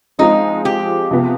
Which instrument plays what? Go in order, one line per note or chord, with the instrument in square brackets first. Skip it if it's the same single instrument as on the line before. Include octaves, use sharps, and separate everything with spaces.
[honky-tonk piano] F3 G#3 C4 F4 G#4 [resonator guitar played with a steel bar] D#4
[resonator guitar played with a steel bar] G4
[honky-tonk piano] C3 F3 B3 F4